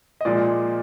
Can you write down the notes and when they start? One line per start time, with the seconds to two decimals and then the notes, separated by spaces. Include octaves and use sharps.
0.21 D#5
0.25 A#2 F3 G#3 D5